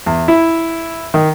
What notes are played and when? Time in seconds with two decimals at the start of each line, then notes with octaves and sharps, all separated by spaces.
0.06 E2
0.28 E4
1.14 D#3